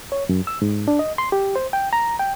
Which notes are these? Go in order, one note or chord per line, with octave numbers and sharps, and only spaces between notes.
C#5
F#2
E6
G#2
D4
D#5
C6
G4
C5
G5
A#5
G5